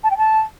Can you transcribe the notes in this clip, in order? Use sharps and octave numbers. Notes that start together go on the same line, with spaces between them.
A5
G5
A5